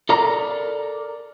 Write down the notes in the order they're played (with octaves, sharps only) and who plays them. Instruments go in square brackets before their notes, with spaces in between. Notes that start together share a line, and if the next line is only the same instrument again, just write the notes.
[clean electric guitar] A4 A#4 D5 A#5